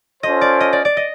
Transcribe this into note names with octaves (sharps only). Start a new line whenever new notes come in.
C#4 F4 A4 C5 D#5
D5
D#5
D5
D5
D#5